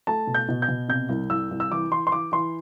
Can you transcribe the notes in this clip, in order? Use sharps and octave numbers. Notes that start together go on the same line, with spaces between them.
A3 A5
B2
G6
B2
G6
B2
C3 G6
C2
C2 E6
C2
E6
E3 D6
E3 C6
C6
E3 D6
E3 C6